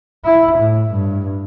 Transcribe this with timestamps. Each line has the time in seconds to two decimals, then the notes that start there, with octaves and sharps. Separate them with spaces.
0.25 E4
0.59 A2
0.93 G2